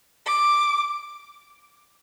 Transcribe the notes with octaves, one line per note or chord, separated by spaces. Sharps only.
D6